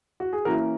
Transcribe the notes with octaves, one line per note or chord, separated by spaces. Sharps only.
F#4
G#4
E3 A#3 C#4 E4 F#4 A#4